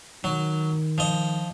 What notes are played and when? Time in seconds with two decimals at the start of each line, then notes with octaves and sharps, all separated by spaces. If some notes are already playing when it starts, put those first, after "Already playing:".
0.24 D#3 F#3
0.98 F3 D#5